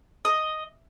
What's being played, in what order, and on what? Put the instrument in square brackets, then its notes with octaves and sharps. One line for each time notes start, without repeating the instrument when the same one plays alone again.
[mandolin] D#5